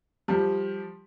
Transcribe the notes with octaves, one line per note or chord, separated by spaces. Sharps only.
F3 G3